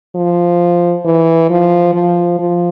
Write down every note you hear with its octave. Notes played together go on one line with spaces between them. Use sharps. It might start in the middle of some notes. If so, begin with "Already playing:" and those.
F3
E3
F3
F3
F3